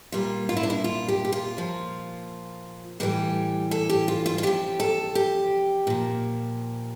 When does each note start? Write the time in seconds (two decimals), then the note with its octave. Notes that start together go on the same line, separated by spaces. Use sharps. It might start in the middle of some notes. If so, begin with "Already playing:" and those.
0.12 A#2 G3 F4
0.49 F4
0.57 E4
0.63 D4
0.70 E4
0.84 F4
1.08 G4
1.25 G4
1.32 F4
1.57 A#2 F3
3.00 A2 E3 G3 G4
3.71 A4
3.89 G4
4.08 F4
4.26 F4
4.38 F4
4.43 C3 F3 G4
4.80 A4
5.15 G4
5.87 A#2 F3